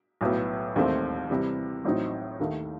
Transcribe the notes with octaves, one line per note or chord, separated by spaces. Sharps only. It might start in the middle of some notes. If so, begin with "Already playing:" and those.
B1 A2 F#3 B3
E1 D#2 D#3 A3 C4
C3 E3 G3
A1 A2 F#3 C4 D#4
D#2 D#3 A3